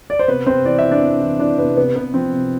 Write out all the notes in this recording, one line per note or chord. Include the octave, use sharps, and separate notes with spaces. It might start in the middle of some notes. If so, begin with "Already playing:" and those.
D5
C5
C3 B3 B4
C3 C4 C5
E3 D5
E5
E3
D4 D5
C3
E3
E3 D4 D5
C3 B3 B4
C3 B3 B4
C3 B3 B4
F3 C4 C5
C3